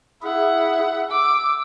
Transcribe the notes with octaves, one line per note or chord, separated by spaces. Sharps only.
E4 G#4 E5 F#5
D6 E6